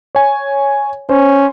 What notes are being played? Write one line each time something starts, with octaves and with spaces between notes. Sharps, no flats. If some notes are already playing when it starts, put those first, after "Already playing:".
C#5 G#5
C#4 C5